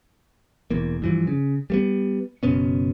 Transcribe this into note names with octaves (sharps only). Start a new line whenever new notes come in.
E1 E2 A#3
G2 E3 F3
C#3
G3 A3 B3
F#1 B2 B3 C#4